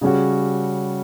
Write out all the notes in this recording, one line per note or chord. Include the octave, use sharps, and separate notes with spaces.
C#3 G3 C#4 F#4